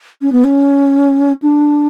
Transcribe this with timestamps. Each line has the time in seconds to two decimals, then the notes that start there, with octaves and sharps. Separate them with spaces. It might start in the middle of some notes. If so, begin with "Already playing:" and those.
0.22 C#4
0.32 B3
0.44 C#4
1.42 D4